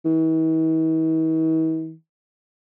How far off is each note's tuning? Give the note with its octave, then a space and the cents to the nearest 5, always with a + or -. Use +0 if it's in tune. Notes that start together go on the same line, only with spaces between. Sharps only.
E3 -45